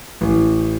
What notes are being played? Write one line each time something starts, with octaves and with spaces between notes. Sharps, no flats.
A1